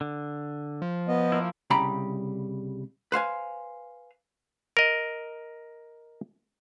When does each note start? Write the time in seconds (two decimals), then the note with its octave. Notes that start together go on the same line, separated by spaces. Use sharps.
0.01 D3
0.82 F3
1.08 B3 D#5
1.32 A#3 E4
1.70 C2 C#3 G3 G5 A#5 B5
3.12 B4 C5 F5 G#5
4.77 A#4 D#5